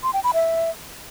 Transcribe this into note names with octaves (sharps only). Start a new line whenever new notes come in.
C6
G5
B5
E5